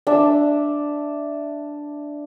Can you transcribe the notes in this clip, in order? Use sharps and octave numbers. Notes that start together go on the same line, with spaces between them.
D4 E5